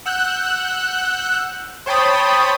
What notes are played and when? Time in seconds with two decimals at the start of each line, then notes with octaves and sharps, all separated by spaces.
0.06 F#5 E6 F#6 G6
1.86 C5 C#5 G5 A5 B5 D#6